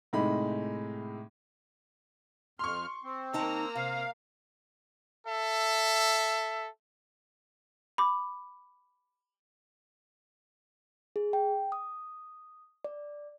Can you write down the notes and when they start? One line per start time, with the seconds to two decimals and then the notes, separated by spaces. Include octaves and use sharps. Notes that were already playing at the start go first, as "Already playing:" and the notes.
0.13 A2 C3 G#3 D#4 B5
2.59 F2 C6 C#6 F6
3.04 C4
3.33 D#3 A#3 D#4 A5 A#5
3.75 C3 F5
5.26 A4 E5
7.98 B5 D6
11.16 G#4
11.33 G5
11.72 D#6
12.84 D5